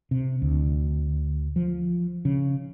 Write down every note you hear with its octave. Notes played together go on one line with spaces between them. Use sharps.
C3
D2
F3
C#3